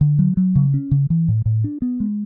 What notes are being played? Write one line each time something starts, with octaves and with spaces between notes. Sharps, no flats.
D3
F#3
F#3
C#3
C#4
C#3
E3
A2
A2
D4
B3
G#3